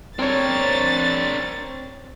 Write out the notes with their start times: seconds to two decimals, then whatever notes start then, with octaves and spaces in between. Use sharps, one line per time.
0.19 C4 D4 A#4 C#5 A6